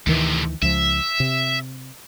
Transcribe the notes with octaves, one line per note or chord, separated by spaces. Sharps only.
D2 A2 C3 D#3 E3
C#2 F3 E5
C3